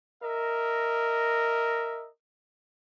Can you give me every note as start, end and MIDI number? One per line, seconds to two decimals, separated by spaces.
0.23 2.08 70
0.23 2.08 75
0.23 2.08 76